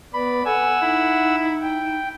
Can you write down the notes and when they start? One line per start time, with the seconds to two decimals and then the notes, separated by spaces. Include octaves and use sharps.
0.14 B3 B4 D5 B5
0.46 A4 F#5 G#5 E6
0.82 D#4 E4
1.62 G5